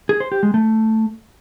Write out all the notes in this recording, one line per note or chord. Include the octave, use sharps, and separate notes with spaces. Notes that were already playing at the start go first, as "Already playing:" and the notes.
G#4
C5
G4
G#3
A3